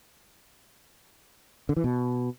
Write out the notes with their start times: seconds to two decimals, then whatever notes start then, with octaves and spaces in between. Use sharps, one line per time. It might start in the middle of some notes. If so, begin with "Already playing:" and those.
1.69 D3
1.77 E3
1.84 B2